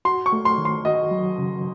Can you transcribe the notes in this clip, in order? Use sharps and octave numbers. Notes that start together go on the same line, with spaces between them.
F#4 C6
C#6
A3
C6
D#3
C6
F#4 D#5
F#3
C#3